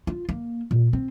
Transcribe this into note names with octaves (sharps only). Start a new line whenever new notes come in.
F4
A#3
A#2
C4